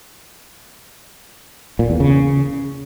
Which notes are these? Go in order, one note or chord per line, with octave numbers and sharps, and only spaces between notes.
A#2
E2
C#3